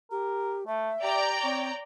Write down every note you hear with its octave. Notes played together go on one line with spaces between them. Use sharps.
G4 A#4
A3 E5
G4 D5 G5 A#5
C4 C#5